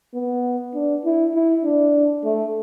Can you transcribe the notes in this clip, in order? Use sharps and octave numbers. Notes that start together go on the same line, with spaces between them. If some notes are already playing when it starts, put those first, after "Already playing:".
B3
D4
E4
E4
D4
A3